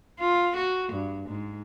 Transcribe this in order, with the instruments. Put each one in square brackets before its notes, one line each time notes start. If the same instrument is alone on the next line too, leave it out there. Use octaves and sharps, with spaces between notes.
[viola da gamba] F4
F#4
G2
G#2